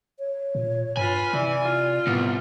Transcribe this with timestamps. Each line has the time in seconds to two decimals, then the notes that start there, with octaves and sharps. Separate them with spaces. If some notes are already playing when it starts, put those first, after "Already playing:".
0.19 C#5
0.55 A#2
0.97 G2 F4 B4 G#5
1.33 C3 E3 D5
1.62 F4
2.07 C2 A2 B3